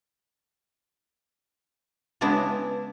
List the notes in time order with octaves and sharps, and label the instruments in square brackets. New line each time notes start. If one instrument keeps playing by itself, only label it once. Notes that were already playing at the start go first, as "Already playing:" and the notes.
[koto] C#3 G#3 B3 D4 E4